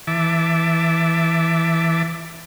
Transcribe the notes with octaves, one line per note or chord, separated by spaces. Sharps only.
E3 E5 A5 D6